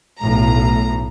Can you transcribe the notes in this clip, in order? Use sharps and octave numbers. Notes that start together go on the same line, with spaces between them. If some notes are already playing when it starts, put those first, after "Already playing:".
B1 A2 A#5